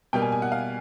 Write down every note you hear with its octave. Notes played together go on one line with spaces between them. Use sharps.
B2 G3 A#3 G5
G#5
G#5
F#5
F5